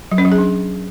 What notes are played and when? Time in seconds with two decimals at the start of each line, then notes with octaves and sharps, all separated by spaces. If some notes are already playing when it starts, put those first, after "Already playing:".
0.12 F#3
0.18 C#4
0.25 F#3
0.32 G#4
0.38 D4